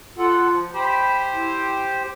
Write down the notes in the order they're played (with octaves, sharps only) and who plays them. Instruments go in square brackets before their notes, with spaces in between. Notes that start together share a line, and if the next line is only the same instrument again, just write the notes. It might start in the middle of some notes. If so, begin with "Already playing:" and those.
[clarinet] F4 [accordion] A4 F#5
[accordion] F3
[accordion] G4 C5 [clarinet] B5
[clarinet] E4